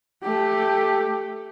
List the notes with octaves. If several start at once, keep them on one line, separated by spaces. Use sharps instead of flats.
A3 G4